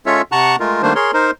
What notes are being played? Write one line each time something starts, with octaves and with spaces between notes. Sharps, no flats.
G#3 C#4 F4 A4 C#5 E5
C3 F#5 A5 A#5 C#6 F#6
G#3 A3 F4 A#4
D#3 G3 A3 A#3 D4 C5
G#4 A#4 C#5 C6
D#4 A#4 C5